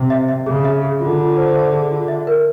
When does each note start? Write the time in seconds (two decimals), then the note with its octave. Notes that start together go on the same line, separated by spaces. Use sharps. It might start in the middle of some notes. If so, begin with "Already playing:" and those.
Already playing: C3
0.10 E5
0.28 E5
0.46 C#3 G#4
0.65 E5
0.82 G#4
1.00 D3 F4
1.18 F4
1.37 C5
1.55 E5
1.73 G#4
1.91 F4
2.08 E5
2.27 A#4